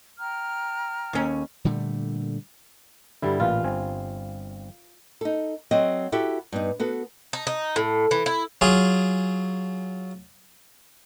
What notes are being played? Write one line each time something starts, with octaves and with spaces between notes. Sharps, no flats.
G5 A#5 F6
D#2 C#4
A#2 D3 G3 A3
G2 D3 G3 E4
A1 A#2 F4 B4
G1 C4 G#5
D#4 A4
F#3 C4 A4 D#5
E4 F#4 G4 A4
G2 B3 D#4
B3 F#4 A4
D#4
D#4
A2
E3
E4
F#3 F4 G#4